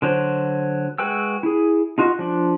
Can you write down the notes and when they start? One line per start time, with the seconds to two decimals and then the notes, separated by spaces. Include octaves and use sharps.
0.02 D3 F#3 C5
0.98 G#3 F#4 B4 G5 E6
1.43 E4 G#4
1.98 D#4 F4 F#4 D#5
2.19 F3 D4